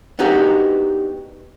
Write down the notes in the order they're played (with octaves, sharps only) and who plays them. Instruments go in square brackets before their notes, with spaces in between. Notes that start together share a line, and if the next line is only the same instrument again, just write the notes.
[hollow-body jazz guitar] B3 D4 D#4 F#4 G4 A#4